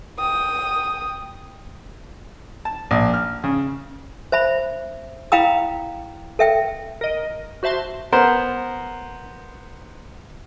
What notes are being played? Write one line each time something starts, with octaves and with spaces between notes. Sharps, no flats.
G5 D#6
A5
A#1
F6
C#3
C5 E5 B5
E4 F5 G5 A#5 B5 D#6
A4 E5 G5
A#4 D#5
F#4 C5 E5 A5 C6
B3 A#4 C5